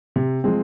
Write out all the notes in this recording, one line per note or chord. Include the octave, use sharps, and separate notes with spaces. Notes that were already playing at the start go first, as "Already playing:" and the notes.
C3
F3 G#3 C4